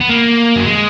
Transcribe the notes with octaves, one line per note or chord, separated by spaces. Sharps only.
B3
A#3
F#3
G#3